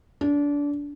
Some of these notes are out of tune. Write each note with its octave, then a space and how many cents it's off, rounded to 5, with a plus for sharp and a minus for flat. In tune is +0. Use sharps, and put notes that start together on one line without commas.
D4 -25